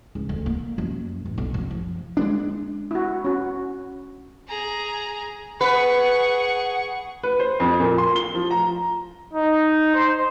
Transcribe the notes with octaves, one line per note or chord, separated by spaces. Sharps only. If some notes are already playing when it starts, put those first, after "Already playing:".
C#2
D2
A#3
F#2
A1
B1
F#2
F3
G#3 B3 D4
E4 F#4
C#4 F#4
G#4 A#5
G#4 B4 F#5 C#6
B4
C5
F2
A#2
C6
G7
F3
A#5
D#4
C5